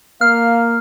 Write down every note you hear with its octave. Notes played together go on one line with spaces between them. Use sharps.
A#3 F5 F6